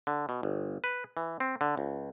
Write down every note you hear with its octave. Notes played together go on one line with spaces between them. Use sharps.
D3
B2
G1
B4
E3
C4
D3
C#2